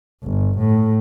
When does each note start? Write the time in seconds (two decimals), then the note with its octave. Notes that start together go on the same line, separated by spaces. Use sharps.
0.23 G1
0.58 A2